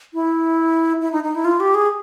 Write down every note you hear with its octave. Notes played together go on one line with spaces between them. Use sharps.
E4
E4
D#4
D#4
E4
F4
G4
G#4